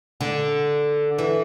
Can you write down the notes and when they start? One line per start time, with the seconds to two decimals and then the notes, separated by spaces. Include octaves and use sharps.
0.21 D3
1.18 E3